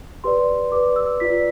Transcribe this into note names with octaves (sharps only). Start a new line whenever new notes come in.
G4 B4 D5 C6
G4 B4 D5 D6
E6
F4 B4 D5 B6